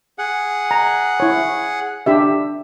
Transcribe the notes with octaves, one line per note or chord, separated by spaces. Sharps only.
G#4 F#5
A#5
E4 C#5
D4 G4 E5